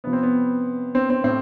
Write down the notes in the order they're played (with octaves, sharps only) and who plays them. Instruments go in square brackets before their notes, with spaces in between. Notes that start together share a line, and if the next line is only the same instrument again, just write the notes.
[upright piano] C3 F3 B3
C4
B3
C4
C4
A2 C4